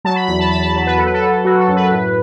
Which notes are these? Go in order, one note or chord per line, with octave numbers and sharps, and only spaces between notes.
F#3 A5
B5
E2 B5
A5
E2 B5
A5
F#3 A5
B4
F#3 A4
B4
A4
F#3
F#3 F#4
A4
F#2
B4
A2